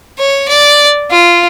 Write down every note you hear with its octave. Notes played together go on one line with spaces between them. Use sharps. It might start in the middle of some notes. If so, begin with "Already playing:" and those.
C#5
D5
F4